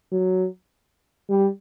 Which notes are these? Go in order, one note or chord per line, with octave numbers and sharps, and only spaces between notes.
F#3
G3